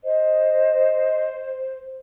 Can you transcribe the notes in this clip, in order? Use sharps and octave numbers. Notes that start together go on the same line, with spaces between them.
C5 D#5